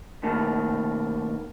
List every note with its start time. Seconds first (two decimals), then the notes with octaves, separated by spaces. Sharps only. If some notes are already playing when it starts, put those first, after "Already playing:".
0.23 B2 D#3 A3 A#3